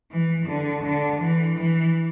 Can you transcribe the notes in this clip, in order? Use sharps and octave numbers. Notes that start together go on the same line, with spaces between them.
E3
D3
D3
E3
E3